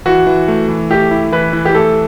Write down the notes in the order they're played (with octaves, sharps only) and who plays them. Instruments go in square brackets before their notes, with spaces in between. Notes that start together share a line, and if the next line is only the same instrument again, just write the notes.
[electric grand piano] E3 [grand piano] F#4
[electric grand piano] E3
A3
E3
[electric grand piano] A3 [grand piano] G4
[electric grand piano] E4
[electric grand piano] E3 [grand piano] B4
[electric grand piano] E3
[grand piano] G4
[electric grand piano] A3 [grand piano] A4